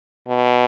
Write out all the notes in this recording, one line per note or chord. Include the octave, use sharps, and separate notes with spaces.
B2